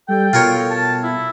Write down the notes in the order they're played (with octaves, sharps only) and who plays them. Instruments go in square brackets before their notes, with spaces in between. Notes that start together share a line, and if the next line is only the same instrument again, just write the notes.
[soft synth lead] G3 [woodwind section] A4 G5
[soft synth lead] B2 [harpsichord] F4 A#4 C#5
[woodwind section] A5
E4